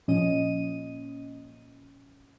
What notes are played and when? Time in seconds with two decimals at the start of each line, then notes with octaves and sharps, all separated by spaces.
0.08 A#2 F3 C#4 D#5 D#7